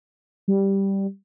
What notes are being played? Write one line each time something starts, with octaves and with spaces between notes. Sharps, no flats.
G3